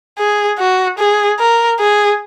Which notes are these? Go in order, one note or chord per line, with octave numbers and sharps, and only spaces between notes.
G#4
F#4
G#4
A#4
G#4